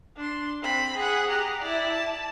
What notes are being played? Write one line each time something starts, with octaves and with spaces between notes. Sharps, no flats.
D4 C6
C4 B5
G#4 F#5
G4 A#5
E4 D5
A5